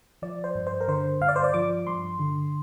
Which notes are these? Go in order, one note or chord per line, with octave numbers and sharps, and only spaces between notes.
F3 D5
C5
G2
C5
A#4
D3 C5
G2 F5
D5
C5
D5
F3 D6
G2 C6
D3